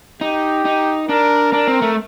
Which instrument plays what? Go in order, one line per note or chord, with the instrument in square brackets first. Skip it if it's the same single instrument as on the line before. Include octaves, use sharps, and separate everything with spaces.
[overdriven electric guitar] D#4 [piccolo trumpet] G4
[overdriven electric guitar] D#4
[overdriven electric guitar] D4 [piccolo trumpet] A#4
[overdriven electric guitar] D4 [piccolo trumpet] A#4
[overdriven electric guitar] C4
A3